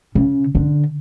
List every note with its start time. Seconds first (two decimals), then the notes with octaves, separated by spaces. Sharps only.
0.15 C#3
0.55 D3